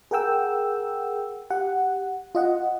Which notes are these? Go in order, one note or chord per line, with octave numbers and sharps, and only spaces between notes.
G#4 A#4 F#5 G5 E6
G4 F#5
F4 D#5 F#5